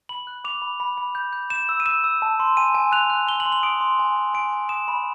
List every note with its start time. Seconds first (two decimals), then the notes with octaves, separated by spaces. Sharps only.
0.09 B5 F#7
0.27 F#6
0.44 D6 F7
0.62 B5
0.80 B5
0.97 B5
1.15 G6
1.33 G6
1.50 G6 E7
1.69 E6
1.80 D#7
1.86 E6 E7
2.04 E6
2.22 A5
2.40 C6
2.57 G#5 D#7
2.75 G#5
2.92 F#6 F7
3.10 F#6
3.27 F#6 G7
3.40 F#7
3.46 C6
3.52 F#7
3.63 D#6 D7
3.81 C6
3.99 G#5
4.16 G#5
4.34 G#5 D7
4.53 G#5
4.69 D#6 E7
4.88 B5